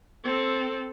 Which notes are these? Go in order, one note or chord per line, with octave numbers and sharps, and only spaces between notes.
C4 A4